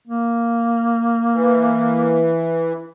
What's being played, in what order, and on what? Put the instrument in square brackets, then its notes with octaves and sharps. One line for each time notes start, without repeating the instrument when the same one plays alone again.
[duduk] A#3
[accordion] E3